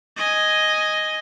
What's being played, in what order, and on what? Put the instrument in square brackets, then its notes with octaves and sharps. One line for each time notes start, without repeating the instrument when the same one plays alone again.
[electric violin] D#5 G#5